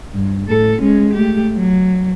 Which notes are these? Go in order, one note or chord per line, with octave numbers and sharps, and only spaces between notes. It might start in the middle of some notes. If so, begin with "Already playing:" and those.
G2
A2 A4
G#3 C#4
A3 G4
F#3